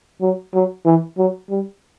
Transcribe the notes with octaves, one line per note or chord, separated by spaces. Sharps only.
F#3
F#3
E3
F#3
G3